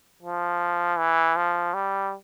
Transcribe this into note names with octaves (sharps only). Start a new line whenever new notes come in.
F3
E3
F3
G3